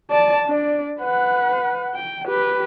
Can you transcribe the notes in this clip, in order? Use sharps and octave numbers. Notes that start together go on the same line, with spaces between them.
D5 A5
D4 D5
B4 F#5
G5
G4 B4